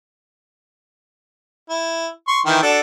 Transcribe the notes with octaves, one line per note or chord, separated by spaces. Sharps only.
E4
C6 C#6
D#3 E3 G5
D4 F#4 A4